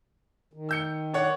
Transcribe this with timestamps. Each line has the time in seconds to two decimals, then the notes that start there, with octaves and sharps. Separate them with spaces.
0.53 D#3
0.69 E6 G6 C#7
1.14 D4 C#5 F#5